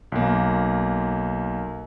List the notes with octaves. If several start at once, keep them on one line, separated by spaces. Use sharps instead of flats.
B1 A#3